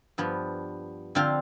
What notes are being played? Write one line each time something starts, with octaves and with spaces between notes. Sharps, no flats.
G2 F3 B3
D3 F3 C4 F4